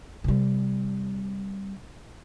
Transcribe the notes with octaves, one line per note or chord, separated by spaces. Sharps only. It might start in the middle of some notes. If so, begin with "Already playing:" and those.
C3 G3